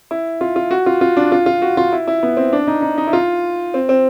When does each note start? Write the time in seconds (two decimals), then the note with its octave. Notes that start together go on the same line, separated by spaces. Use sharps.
0.11 E4
0.41 F4
0.56 F4
0.71 F#4
0.86 F4
1.01 F4
1.17 D4
1.32 F4
1.46 F4
1.62 F#4
1.77 F4
1.92 E4
2.08 E4
2.23 B3
2.37 C4
2.53 D4
2.67 D#4
2.82 D#4
2.98 D#4
3.07 E4
3.13 F4
3.74 C4
3.89 C4